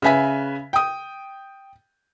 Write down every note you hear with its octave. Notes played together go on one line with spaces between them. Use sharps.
C#3 B4 E5 G#5 B6
G5 D#6